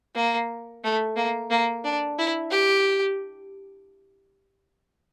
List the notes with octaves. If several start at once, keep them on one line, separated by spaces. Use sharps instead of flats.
A#3
A3
A#3
A#3
D4
E4
G4